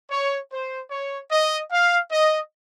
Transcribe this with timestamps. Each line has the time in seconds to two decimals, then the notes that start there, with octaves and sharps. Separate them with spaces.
0.11 C#5
0.52 C5
0.91 C#5
1.31 D#5
1.72 F5
2.12 D#5